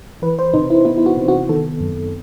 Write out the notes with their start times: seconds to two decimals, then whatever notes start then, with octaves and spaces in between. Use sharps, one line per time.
0.22 E3 B4
0.39 C5
0.54 C3 D#4
0.70 E4
0.85 B3 E4
0.98 E4
1.06 F#4
1.17 C3
1.28 F#4
1.49 D#3 A4
1.80 F#2